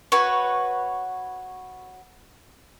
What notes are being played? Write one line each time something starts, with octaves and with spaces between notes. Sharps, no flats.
F#4 B4 C#5